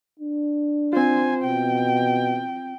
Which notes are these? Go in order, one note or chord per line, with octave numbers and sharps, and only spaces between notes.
D4
C4 F4 C5 G#5
B2 G5